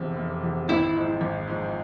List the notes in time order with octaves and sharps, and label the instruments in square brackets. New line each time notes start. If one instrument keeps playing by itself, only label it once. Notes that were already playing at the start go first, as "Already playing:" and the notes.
Already playing: [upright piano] F1 E2 C3
F1
E2 C3
[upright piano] G#1 [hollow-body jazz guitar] E4
[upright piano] G#2 F3
G#1
G#2 F3